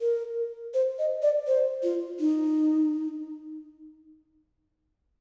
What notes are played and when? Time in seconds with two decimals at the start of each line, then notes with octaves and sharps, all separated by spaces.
0.01 A#4
0.74 C5
0.99 D#5
1.23 D5
1.47 C5
1.83 F4
2.20 D#4